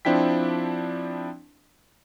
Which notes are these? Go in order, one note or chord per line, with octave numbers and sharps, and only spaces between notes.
F3 C4 D4 E4 G5 B6